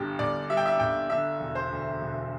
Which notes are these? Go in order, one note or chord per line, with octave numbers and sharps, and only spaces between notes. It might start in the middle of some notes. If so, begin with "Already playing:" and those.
Already playing: G1 G2 G3 G4
G1 D5
G3 E5
G5
E5
G1 G5
D3 E5
E1
C5
D2
E1